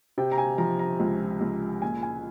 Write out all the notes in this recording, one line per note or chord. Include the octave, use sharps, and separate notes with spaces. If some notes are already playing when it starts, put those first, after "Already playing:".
C3 G5
A#5
G#5
F3 A#5
A#5
C#2
C#2
A#2 G#5
G#5